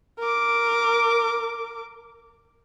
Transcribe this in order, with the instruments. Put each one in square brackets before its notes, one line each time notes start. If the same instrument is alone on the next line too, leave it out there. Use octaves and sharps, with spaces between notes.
[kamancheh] A#4 D6